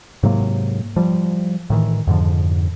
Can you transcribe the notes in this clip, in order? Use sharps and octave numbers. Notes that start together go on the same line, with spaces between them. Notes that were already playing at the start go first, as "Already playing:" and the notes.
G#2 C3 F#3 A#3
F3 G3
A2 D#3 E3
F2 G#2 D3 F3